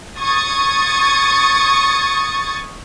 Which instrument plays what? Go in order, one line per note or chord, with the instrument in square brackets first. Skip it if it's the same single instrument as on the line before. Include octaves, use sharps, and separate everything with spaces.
[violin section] C#6 D#6 G#6 A6